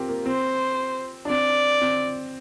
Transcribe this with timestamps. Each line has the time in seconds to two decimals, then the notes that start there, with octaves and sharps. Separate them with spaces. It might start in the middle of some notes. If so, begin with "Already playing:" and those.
Already playing: C4 F4 G4 A#4
0.09 A#3
0.26 C4 C5
1.25 D4
1.29 C4 D5
1.81 C4